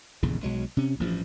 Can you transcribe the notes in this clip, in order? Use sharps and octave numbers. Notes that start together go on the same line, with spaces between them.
D#1 A#1 E2 C#3
B1 F#3 G#3
C3 C#4
A1 G2 F3